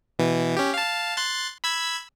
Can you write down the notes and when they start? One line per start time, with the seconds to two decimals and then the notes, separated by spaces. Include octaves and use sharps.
0.19 B2 E3
0.57 C#4 G4
0.74 F5 A5
1.17 C6 F#6 A6
1.64 B5 E6 G#6